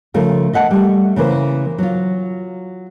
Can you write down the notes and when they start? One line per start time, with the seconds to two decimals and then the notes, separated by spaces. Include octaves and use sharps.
0.14 C#3 F3 A3 F4 A#4
0.53 D#5 E5 F#5 A5
0.71 G3 A3
1.16 C#3 E3 A#3 C5
1.78 F#3 F4